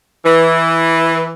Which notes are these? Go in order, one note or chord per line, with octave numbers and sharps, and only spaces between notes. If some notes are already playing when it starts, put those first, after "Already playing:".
E3